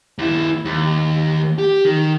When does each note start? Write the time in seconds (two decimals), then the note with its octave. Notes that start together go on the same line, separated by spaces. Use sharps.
0.18 D#2 E4
0.65 D#2
1.59 G4
1.85 D#3